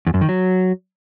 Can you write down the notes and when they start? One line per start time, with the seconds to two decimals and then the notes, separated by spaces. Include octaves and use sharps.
0.07 E2
0.14 F#2
0.21 D#3
0.29 F#3